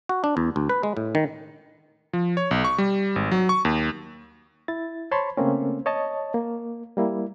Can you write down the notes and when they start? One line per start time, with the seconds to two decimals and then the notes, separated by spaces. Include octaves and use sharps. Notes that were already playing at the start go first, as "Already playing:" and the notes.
0.09 F#4
0.24 D4
0.37 E2
0.56 D2
0.69 B4
0.83 G#3
0.97 A2
1.15 D#3
2.13 F3
2.37 C#5
2.51 B1
2.64 C#6
2.78 G3
3.16 G#1
3.31 F#3
3.49 C#6
3.65 D#2
4.68 E4 A6
5.11 C5 C#5 A5 B5 C6
5.37 C#3 A3 A#3 C4 C#4
5.86 C#5 D#5 A5
6.34 A#3
6.97 G3 A#3 E4